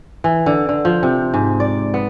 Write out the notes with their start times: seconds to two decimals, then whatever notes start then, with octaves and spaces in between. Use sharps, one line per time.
0.24 E3
0.46 D3
0.69 D3
0.85 F3
1.03 C3
1.34 G#2
1.60 D5
1.94 B3